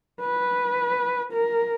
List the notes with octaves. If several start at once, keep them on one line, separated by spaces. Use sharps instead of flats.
B4
A#4